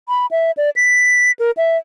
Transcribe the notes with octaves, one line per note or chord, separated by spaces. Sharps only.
B5
E5
D5
B6
A#4
E5